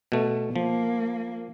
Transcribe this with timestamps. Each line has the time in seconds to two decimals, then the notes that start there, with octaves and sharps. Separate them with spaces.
0.12 B2 A3
0.56 F3 A#3